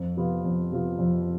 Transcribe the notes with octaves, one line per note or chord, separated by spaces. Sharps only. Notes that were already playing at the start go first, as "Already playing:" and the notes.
Already playing: F2
C3 F3 B3 F4
F2
C3 F3 B3 F4
F2